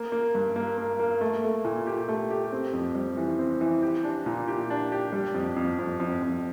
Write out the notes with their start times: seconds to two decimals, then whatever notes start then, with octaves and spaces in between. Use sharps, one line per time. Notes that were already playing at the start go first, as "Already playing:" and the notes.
Already playing: A#3
0.12 A#3
0.35 G2
0.56 A#3
0.77 A#3
0.99 A#3
1.21 A3
1.44 A3
1.65 A#2
1.87 G4
2.08 A3
2.30 G4
2.52 C4
2.73 F2
2.95 G3
3.17 E3
3.39 C4
3.61 E3
3.82 G4
4.04 D4
4.26 A#2
4.48 G4
4.70 D4
4.92 G4
5.13 G3
5.34 F2
5.56 F2
5.79 F2
6.00 F2
6.22 F2